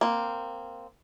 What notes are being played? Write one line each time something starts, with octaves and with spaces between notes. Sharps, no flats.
A#3 C4